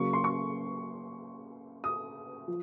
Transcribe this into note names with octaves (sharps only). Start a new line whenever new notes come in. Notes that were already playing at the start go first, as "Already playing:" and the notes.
Already playing: C#3 F#3 A#3 C#6
C6
C#6
D#6
F3